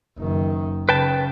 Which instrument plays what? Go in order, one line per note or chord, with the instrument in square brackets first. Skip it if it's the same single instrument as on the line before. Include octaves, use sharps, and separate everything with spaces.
[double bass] F#1 D#3
[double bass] C#3 [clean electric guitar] B4 G5 A5